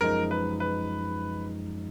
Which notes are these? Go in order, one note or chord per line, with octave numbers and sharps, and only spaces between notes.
F#2 F3 G#3 D#4 A#4
B4
B4